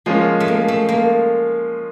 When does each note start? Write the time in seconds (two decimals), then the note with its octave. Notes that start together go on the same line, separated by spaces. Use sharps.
0.06 F3 G#3 A#3 C#4
0.40 A3
0.48 A#3
0.68 A3
0.89 A#3